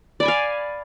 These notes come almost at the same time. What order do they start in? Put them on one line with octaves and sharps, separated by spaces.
D5 B5 G#5 F5